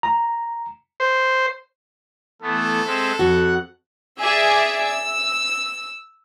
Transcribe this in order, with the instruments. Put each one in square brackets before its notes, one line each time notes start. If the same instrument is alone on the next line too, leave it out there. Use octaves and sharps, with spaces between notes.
[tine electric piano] A#5
[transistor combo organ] C5
[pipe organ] E3 A3 B3 [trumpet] A4
[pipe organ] G#3 C4 E5
[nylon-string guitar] F2 F#4 [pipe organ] F#5
[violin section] G#4 D5 E5 E6
E6